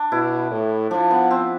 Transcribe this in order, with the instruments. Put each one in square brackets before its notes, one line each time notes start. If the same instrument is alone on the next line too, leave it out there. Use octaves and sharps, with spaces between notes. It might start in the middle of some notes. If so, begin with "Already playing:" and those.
Already playing: [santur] D4
[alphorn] B2 [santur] E4
[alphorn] A2
[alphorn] F3 [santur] D4
[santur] B3
C4